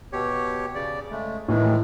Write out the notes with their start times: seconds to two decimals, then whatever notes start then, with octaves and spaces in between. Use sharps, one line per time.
0.13 B2 G4 C#5
0.75 C#3 D5
1.11 C#3 G#3 A3
1.48 A2 D#3 E3 G#3